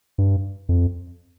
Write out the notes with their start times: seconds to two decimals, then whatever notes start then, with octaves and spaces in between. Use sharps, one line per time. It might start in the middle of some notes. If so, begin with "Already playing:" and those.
0.18 G2
0.69 F2